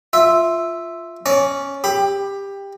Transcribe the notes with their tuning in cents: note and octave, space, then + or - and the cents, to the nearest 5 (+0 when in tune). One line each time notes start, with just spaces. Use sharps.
F4 +0 E5 +0
C#4 +0 D5 -25
G4 +15 B5 +0